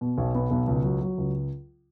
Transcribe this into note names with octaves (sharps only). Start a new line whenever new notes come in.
B2
B1
B3
B1
C#2
F#3
F#3
C#2